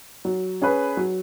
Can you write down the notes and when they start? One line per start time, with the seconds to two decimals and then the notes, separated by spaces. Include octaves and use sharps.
0.25 F#3
0.62 C#4 G#4 B4
0.97 F#3